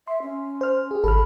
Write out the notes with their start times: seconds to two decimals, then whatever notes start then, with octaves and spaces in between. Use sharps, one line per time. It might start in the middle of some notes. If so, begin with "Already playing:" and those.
0.07 E5 C6
0.22 C#4
0.61 C5 F6
0.91 G4 G#4
1.04 G#1 A4 B5 F6